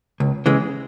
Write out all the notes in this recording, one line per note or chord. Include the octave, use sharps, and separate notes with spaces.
C#2
C#3 E3 G#3